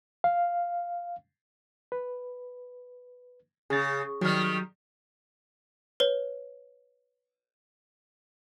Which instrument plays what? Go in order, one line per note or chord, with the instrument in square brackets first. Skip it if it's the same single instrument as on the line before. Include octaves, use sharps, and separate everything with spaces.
[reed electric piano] F5
B4
[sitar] C#3 [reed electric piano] G#4 A6
[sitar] D#3 G3 [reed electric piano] F#3 F6
[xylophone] B4 C#5